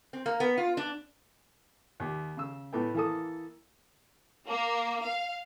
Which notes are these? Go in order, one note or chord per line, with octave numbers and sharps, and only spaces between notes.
C4
A#3
B3
F4
D4
D#2 G4
C#3 E6
A2 B3 A4 G5
E3 A#3 A4 D#6
A#3
F5